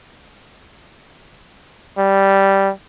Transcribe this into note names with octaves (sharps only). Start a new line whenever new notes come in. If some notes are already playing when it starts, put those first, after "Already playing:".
G3